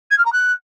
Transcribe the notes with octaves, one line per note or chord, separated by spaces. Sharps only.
G#6
F6
A#5
F#6